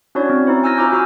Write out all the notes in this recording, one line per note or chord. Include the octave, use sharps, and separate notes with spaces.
C#4 D4 E4 F#4 C#5 D5
C4
D#4 E4 C5
G#5 C#6 E6 F6 G6 A#6
F4 C5 A#5 B5 D6 G6
F4 F#4 G#5 E6 F6